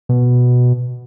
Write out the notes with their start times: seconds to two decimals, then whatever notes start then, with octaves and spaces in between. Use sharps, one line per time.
0.09 B2